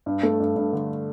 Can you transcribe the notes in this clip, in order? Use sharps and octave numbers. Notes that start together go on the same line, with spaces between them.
G2
A3
G2
G2
D3